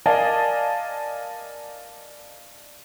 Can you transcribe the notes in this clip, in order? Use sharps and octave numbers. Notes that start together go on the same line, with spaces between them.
A#4 D5 D#5 F5 G#5 A5